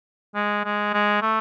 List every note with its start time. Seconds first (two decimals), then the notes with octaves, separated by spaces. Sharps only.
0.35 G#3
0.65 G#3
0.93 G#3
1.22 A3